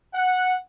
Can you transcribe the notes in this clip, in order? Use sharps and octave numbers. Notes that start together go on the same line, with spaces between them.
F#5